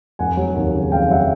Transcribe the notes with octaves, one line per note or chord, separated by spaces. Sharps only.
F1 F#5 G#5
F#3
D#2
C#3
F1 F5 G5
F#3 E5 F#5